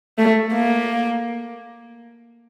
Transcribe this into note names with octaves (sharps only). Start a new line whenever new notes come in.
A3
A#3